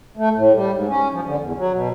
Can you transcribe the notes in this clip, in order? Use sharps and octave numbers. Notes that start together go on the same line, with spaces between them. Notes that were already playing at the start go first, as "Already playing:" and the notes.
A3
A2
G3
G#2
C#4
F3
D3
E2
F#3
B2